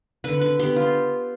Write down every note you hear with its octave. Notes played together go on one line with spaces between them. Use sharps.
D3 B4
B4
B3 G4
F4